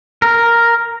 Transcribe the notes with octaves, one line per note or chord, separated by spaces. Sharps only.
A#4